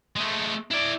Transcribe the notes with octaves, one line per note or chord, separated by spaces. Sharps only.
G#3 A3
E4 D5